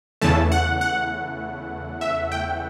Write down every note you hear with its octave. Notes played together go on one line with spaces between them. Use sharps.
E2 C#3 E3 A3 A5
F#5
F#5
E5
G5